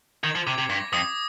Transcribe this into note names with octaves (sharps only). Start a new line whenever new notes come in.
D#3 G#6
F3
C3 D6
C3
G2 A#6
F2 D#6